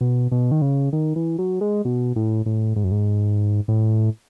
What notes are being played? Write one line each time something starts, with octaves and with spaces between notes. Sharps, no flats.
B2
B2
D#3
C#3
D#3
E3
F#3
G#3
B2
A2
A2
G#2
F#2
G#2
A2